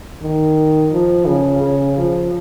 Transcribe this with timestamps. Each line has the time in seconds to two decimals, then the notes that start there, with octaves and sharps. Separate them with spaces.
0.22 D#3
0.92 F3
1.27 C#3
1.62 C#3
1.98 F3